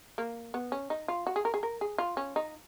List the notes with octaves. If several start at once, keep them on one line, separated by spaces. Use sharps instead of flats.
A#3
B3
C#4
D#4
F4
F#4
G#4
A#4
G#4
A#4
G#4
F4
C#4
D#4